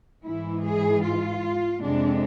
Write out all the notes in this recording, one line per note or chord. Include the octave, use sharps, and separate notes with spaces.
G#2 E3 G#3 E4
G#4
F4
F2 C3 G#3 D4